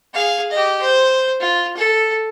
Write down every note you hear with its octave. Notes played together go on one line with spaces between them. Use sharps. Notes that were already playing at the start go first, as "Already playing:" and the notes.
G#4 F5
G4 D#5
C5
F4
A4